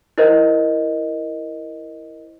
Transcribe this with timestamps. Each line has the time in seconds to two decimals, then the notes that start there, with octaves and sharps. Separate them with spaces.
0.18 E4 A#4 C5 D#5